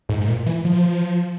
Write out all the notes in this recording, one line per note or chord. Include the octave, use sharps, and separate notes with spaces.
G#2
G#2
A#2
E3
F3